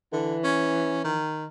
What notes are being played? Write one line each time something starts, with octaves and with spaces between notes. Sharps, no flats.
D3 E3
C#4
D#3